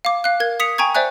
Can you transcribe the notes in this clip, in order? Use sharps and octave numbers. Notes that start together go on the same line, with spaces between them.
F5 D6
F5 F#6
A#4 G#6
D#6 B6 C#7 F7
G5 G#5 A#5 C#6 G#6
C5 D5 E5 G#5 F#6